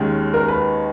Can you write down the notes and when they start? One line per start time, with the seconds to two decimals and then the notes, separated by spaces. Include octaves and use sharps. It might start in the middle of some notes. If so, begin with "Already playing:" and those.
Already playing: D#2 D#3 G#3 C#4
0.34 A#4
0.48 B4